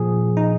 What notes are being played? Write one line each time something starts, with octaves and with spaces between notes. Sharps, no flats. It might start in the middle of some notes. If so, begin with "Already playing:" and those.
Already playing: A#2 F3 G#4
D#4